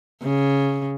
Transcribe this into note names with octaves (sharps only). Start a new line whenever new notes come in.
C#3